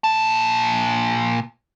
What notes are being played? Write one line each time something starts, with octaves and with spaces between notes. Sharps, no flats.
A#2 A5